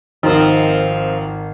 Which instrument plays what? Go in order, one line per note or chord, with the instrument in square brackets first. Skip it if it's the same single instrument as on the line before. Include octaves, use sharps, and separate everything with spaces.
[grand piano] G#1 A#4 [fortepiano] D#3 [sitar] F3 C4